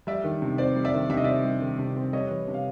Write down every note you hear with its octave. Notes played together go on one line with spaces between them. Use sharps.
G3 D5 E5
D#3
C3
C4 C5 D5
G3
D5 E5
D#3
C3 E5
D#5
C4 D5 E5
G3
D#3
C3
C4
G3 C#5 D#5
E3
C3
F5